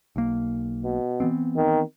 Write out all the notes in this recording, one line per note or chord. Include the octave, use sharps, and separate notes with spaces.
B1 A#3
B2
E3 B3 C4
D#3